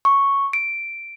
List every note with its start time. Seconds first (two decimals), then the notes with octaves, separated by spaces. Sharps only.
0.05 C#6
0.53 D7